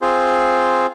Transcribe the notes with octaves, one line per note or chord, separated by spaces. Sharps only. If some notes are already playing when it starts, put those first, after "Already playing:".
C4 F4 G#4 C5